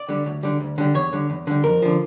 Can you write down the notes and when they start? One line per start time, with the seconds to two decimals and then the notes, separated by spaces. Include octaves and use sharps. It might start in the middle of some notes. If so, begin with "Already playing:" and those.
Already playing: D5
0.09 D3 G3
0.26 D2
0.43 D3 G3
0.60 D2
0.78 D3 G3
0.94 E2 C#5
1.13 D3 G3
1.30 E2
1.47 D3 G3
1.64 F2 A#4
1.82 D3 F3